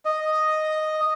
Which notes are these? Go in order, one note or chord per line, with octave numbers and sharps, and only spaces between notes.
D#5